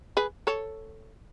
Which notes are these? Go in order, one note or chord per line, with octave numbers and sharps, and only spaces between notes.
G#4 B4
A4 C#5